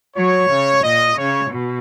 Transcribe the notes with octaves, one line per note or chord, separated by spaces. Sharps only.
F#3 C#5
C#3
A#2 D#5
C#3 C#5
B2